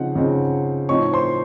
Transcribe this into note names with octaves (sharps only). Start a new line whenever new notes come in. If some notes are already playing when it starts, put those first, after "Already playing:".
Already playing: C#3 F3 C4 D#4 F#5
C#3 F3 C4 D#4
A2 F3 C4 D#4 C#5 C#6
C5 C6